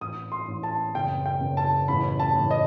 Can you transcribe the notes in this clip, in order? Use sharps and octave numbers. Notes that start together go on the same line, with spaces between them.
A1 D#6
C6
A1
A5
F#1 G5
G5
F#1
A5
A1 B5
A5
A1
D#5